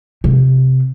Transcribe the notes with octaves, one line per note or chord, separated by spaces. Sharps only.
C3